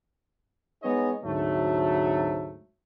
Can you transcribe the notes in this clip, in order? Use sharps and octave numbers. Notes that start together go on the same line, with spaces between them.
G#3 B3 D#4 G#4 C#5 D#5
D2 G#2 C3 F#3 A3